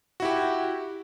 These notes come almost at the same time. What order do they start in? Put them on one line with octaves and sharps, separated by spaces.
F#4 E4 G4